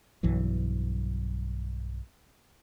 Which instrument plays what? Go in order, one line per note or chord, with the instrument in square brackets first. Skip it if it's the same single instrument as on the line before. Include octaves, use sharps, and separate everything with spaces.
[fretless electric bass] B1 G2 E3 F#3